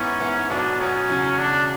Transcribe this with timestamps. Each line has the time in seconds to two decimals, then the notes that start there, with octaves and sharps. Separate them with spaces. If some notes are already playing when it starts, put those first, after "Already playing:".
Already playing: G#2 E3 B3 C#4
0.20 G#2 E3 B3
0.50 B1 B2 F#3 B3 D4
0.80 B1 B2 F#3 B3 C#4
1.09 E2 C#3 F#3
1.38 E2 C#3 F#3 D4